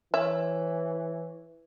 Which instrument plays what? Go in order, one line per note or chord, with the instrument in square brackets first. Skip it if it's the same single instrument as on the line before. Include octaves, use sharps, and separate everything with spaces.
[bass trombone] E3 [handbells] C#5 [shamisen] E5